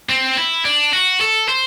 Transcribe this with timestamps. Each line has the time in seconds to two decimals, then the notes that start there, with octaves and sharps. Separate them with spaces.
0.10 C4
0.37 E4
0.65 D4
0.93 F#4
1.21 A4
1.49 C5